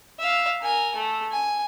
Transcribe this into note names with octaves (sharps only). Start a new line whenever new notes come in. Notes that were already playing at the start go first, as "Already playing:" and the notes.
E5 F5
A#4 G#5
A3
G#5